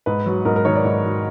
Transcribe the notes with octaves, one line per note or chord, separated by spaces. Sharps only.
G#2 B4
F#3
G#2 A#4
A#4
D#3 C#5
D5
G#2
F#3